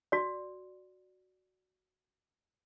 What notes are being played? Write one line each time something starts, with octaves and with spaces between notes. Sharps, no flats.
F#4 D5